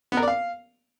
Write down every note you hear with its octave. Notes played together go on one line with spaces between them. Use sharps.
B3
A#4
D5
F5